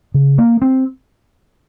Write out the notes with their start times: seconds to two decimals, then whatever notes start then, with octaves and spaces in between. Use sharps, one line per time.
0.14 C#3
0.38 A#3
0.62 C4